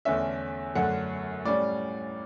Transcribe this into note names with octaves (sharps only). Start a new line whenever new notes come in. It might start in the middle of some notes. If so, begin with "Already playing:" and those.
E2 D3 A3 C#4 E5
F#2 D3 A3 C#4 F#5
A2 G3 C#4 D5